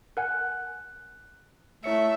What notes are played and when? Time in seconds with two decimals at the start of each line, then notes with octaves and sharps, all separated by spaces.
0.17 A#4 F#5 G#5 F#6
1.84 A3 E4 C#5 E5 C#7